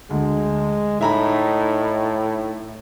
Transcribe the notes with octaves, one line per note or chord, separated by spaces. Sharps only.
D2 G#3
A2 D#4 E5 A#5 B5